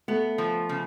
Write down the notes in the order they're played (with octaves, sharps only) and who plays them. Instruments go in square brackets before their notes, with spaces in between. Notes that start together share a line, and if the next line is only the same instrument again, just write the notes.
[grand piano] A3 [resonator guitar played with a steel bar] B3
[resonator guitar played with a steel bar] F3
C#3